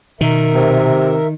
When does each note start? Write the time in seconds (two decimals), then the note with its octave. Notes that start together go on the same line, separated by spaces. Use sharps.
0.21 B2 D#3 A#4 E5
0.55 C3